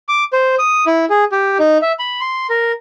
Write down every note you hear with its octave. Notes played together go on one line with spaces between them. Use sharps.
D6
C5
D#6
E4
G#4
G4
D#4
E5
B5
C6
A#4